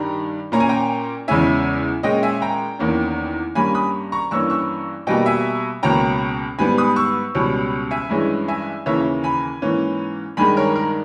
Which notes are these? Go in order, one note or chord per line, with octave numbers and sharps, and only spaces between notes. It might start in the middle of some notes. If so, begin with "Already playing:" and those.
Already playing: G2 D#3 G3 A#5
A#2 A#3 C#4 A#5
G#5
G5 A#5
E2 C#3 G#3 C#4 E5 G#5
A#2 G#3 C#4 D#5 G5
E5 G#5
G5 A#5
E2 D#3 A#3 C#4
G2 G3 A#3 C#4 G#5 B5
B5 D#6
A#5 C#6
G2 E3 A#3 C#4 C#6 E6
C#6 E6
B2 G3 A#3 D#5 G5
E5 G#5
C#2 B2 A#3 C#4 G5 A#5
G#2 G3 B3 G#5 B5
B5 D#6
C#6 E6
C#2 B2 G3 C#4
E5 G#5
G2 E3 G#3 C#4
E5 G#5
D#2 C#3 E3 A#3 C#4 C#5 E5
G#5 B5
G#2 E3 A#3 C#4
G2 D#3 G#3 G#5 B5
A#4 C#5
A#4